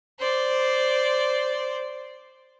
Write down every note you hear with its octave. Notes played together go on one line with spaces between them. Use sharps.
C5 D5